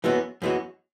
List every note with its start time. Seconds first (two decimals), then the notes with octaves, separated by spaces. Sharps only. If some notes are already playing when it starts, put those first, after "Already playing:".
0.04 F#2 E3 G#3 B3 F#4
0.42 F#2 E3 G#3 B3 F#4